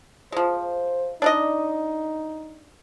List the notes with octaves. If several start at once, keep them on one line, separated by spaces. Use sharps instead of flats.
F3 G#3 C5
D4 D#4 D5 D#5